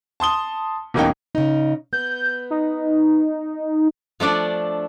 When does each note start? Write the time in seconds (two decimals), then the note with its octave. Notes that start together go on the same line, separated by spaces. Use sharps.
0.20 A5 C6 D#6 G7
0.94 E1 A1 A#3 C#4 D#4 G5
1.35 C#3 D#4
1.93 B3 G6
2.51 D#4
4.20 F3 A3 D4 D5